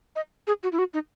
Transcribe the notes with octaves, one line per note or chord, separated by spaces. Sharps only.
D#5
G#4
F#4
E4
F#4
D#4